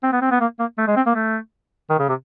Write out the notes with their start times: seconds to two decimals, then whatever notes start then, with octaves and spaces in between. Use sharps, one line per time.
0.03 C4
0.12 B3
0.22 C4
0.31 B3
0.40 A#3
0.59 A#3
0.78 A3
0.87 G#3
0.96 C4
1.06 A#3
1.15 A3
1.90 D#3
1.99 C#3
2.08 C3